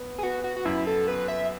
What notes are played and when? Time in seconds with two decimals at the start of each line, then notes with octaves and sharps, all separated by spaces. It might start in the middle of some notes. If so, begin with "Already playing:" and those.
Already playing: B3
0.18 G#4
0.23 B3 F#4
0.44 F#4
0.56 F#4
0.65 F#2 E4
0.87 A4
1.08 B3 B4
1.28 E5